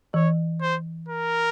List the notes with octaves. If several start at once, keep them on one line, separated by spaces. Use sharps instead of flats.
E3 C#5
C5
A#4